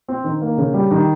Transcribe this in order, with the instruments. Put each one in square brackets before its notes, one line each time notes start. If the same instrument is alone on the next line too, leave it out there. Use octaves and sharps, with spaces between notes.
[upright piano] C4
D#3
A#3
C#3
G3
D#3